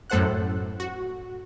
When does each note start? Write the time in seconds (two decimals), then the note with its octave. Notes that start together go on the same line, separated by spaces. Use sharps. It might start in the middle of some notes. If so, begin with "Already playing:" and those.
0.10 F#2 A2 A4 C5 F#5 F#6
0.80 F#4